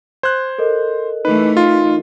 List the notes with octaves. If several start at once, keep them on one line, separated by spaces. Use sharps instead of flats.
C5 F#6 G#6
A4 A#4 D#5
E3 A3 D#4 B4
F4